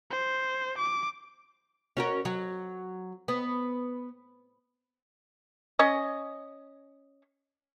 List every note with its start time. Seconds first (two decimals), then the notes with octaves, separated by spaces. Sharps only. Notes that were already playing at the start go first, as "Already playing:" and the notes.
0.11 C5
0.78 D6
1.97 C#4 F#4 A#4
2.25 F#3
3.28 B3
5.79 C#4 D#5